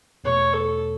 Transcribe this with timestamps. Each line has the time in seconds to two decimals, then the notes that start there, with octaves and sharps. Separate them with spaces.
0.24 E2 B2 A3 C#5
0.53 A4